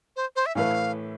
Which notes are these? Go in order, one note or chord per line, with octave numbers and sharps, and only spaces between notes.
C5
C5
E5
A2 E3 A3 E4 B4 F5